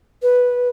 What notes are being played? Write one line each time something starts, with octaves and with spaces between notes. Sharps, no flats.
B4